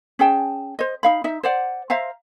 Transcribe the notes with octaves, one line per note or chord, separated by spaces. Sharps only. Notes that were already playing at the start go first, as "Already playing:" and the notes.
C#4 G#4 G5 A5
C5 D#5
D#4 F5 B5
D#4 E5
C5 D5 F#5
C5 E5 F5 A#5